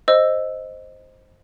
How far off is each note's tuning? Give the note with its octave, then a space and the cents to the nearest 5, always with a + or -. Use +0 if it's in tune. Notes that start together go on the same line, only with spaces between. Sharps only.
C5 +0 D#5 +0 E6 +0